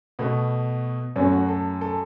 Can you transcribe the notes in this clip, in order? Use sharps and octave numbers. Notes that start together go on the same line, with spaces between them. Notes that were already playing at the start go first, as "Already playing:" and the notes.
B2 A3 B3
F#2 F#3 A3 C#4
F#4
A4
A4